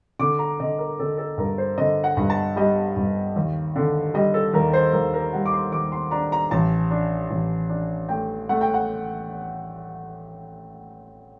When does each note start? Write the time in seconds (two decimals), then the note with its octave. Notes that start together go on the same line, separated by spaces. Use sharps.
0.19 D3 D6
0.39 A#5
0.60 D3 D#5
0.79 A#4
0.99 D3 A4
1.18 A4
1.38 G2 A#4
1.58 C5
1.78 D3 D#5
2.04 F#5
2.17 G2
2.30 A5
2.56 G3 D#5
2.96 G2
3.36 D#2
3.76 D3
4.14 G3 D#5
4.34 A4
4.53 D#2 A#4
4.73 C5
4.93 D#2 A#4
5.14 A#4
5.33 G3 F#5
5.46 D6
5.53 C6
5.72 D#2 D6
5.92 C6
6.11 D4 A#5
6.32 A#5
6.51 A1 A5
6.91 D4
7.30 A1
7.69 D4
8.09 A3 G5
8.49 A3 F#5
8.61 G5
8.74 F#5